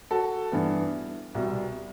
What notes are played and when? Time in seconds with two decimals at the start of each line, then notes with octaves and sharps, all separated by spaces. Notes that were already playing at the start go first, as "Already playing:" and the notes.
0.11 F#4 A4
0.52 G2 E3 B3
1.35 C2 B2 G3